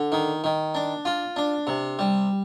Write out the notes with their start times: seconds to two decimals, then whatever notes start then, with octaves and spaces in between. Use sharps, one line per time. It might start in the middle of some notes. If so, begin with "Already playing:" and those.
Already playing: D3
0.12 D#3
0.44 D#3
0.75 D4
1.05 F4
1.36 D4
1.67 C3
1.99 G3